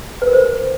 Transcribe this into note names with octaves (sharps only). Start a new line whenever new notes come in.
B4
A#4
C5